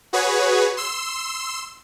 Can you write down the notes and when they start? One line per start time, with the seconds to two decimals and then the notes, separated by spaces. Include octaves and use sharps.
0.13 F#4 G#4 B4 C#5
0.77 C6 E6